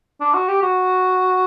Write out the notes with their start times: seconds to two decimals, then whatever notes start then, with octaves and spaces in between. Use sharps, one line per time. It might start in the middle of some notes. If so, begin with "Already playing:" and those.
0.21 D4
0.34 F#4
0.48 G4
0.62 F#4